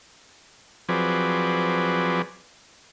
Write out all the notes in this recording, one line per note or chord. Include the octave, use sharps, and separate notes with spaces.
F3 F#3 C4 G#4 B4 D5